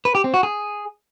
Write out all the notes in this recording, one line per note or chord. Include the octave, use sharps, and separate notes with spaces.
B4
G4
C4
F#4
G#4